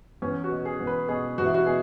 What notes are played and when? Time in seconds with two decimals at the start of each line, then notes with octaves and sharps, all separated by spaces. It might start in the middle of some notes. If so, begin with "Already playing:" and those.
0.22 E2 C#4
0.44 F#4
0.51 B2
0.65 G#4
0.80 E2
0.87 B4
1.09 B2 G#4
1.38 E2 F#4
1.46 E4
1.54 F#4
1.66 B2 G#4